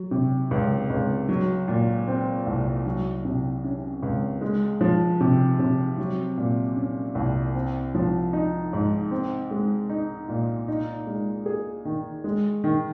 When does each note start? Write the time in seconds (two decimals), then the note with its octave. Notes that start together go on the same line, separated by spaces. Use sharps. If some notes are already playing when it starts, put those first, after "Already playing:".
Already playing: F#3
0.11 C3
0.51 C#2
0.90 C#2
1.29 F#3
1.68 A#2
2.07 C4
2.47 C2
2.86 F#3
3.25 C3
3.64 C#4
4.02 C#2
4.41 G#3
4.81 F3
5.20 C3
5.59 C3
5.98 F#3
6.37 A#2
6.76 C#4
7.15 C2
7.55 C4
7.95 F3
8.33 D#4
8.73 G#2
9.11 C4
9.51 G#3
9.90 D#4
10.28 A#2
10.68 D#4
11.07 G#3
11.46 G#4
11.85 D#3
12.24 G#3
12.64 D#3